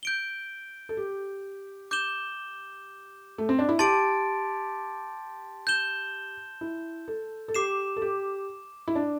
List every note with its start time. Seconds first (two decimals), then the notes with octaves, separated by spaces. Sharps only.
0.03 G6 D7 G7
0.89 A4
0.97 G4
1.91 D6 G6 E7 G7
3.38 A3
3.49 C4
3.59 D4
3.69 E4
3.79 G4 A5 C6 A6 D7
5.67 G6 E7 G7
6.61 E4
7.08 A4
7.48 A4
7.55 G4 D6 C7 E7
7.96 A4
8.02 G4
8.88 E4
8.95 D4